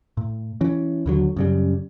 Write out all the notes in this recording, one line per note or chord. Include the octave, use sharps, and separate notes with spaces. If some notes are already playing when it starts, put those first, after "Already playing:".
A2
E3 C#4
D#2 D3 F#3
F#2 C#3 G3